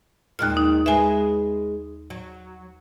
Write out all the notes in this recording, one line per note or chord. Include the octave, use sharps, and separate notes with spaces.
D#2 A#2 D#3 G#3 F6
D#4
G#3 G#4 B4 E5 G#5
F#3